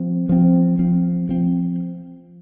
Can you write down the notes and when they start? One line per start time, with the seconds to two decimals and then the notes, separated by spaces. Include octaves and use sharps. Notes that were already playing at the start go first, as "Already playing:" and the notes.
Already playing: F3 C4
0.29 F3 C4
0.79 F3 C4
1.29 F3 C4